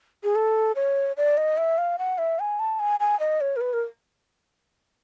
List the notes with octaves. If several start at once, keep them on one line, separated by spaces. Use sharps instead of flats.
G#4
A4
C#5
D5
D#5
E5
F5
F#5
E5
G#5
A5
G#5
G#5
D#5
C#5
A#4
B4
A#4